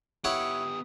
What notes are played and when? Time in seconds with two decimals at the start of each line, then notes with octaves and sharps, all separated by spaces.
0.24 B3 E4 G4 C#5 F#5 D#6